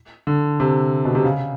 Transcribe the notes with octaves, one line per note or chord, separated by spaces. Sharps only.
D3
C3
B2
C3
C#3